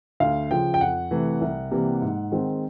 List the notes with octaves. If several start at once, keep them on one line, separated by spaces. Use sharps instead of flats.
D2 F5
C#3 F3 G5
G5
F2 F#5
C3 E3 A3
C2
C3 E3 G3 A#3
G#2
D#3 G#3 C4